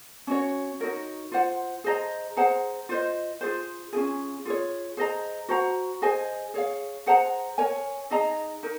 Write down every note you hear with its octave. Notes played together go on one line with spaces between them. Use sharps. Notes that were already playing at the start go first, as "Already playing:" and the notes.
C#4 F#4 C#5
D#4 F#4 A#4 C#5
F4 C5 F#5
G#4 C5 D#5 A#5
G#4 C5 F#5 A#5
F4 C5 D#5
F4 G#4 C5
C#4 F4 G#4
F4 G#4 C#5
G#4 C5 D#5 A#5
F#4 C5 F#5 A#5
G#4 C5 D#5 G#5
G#4 C#5 F5
G#4 C5 F#5 A#5
A#4 C#5 G#5
D#4 G#4 D#5 A#5
D#4 A#4